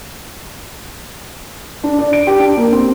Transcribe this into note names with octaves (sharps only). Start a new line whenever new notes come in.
D4
D5
D7
G4
D4
A#3
C4